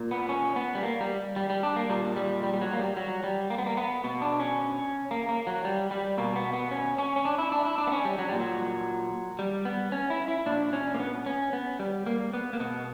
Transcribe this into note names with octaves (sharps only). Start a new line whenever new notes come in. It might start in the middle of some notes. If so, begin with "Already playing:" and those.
Already playing: A#2
B3
C#4
B3
G3
A#3
G3
G3
G3
D4
A#3
A#2 G3
G3
G3
G3
F#3
A#3
G3
F#3
G3
A#3
B3
A#3
B3
B2 B3
D4
C#4
A#3
A#3
F#3
G3
G3
B2 A#3
B3
B3
C#4
C#4
C#4
D4
E4
D4
E4
D4
B3
C#4
G3
F#3
A#2 G3
F#3
G3
B3
C#4
E4
E4
A#2 D4
C#4
A#3
B3
C#4
B3
G3
A#3
B3
A#3
B2 B3